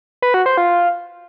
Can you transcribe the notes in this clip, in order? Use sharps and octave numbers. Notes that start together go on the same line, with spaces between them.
B4
F#4
C5
F4